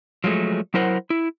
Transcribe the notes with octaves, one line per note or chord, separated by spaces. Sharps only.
F3 F#3 G#3 A3
F#3 E4 A#4 C5 F#5
E4